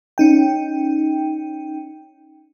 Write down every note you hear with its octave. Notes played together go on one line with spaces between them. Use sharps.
C#4 D#4 G5